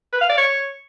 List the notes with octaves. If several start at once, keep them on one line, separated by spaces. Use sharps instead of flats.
B4
F5
D5
C#5